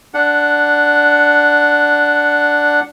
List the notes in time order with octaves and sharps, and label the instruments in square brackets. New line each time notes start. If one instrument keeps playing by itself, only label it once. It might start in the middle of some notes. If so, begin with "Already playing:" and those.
[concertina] D4 F#5